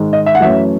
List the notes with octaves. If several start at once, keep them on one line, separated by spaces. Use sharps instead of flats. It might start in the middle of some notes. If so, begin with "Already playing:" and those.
Already playing: G#2 D#3 G#3
D#5
E5
F#5
F#2 E3 A3 C#4 E5